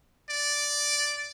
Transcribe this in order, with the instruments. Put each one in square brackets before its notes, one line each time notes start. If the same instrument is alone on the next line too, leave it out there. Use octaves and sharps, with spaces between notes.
[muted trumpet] D5